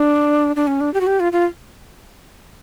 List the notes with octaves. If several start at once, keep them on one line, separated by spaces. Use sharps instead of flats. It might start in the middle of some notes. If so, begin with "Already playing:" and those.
Already playing: D4
D4
C#4
D4
G4
F#4
G4
F4
F4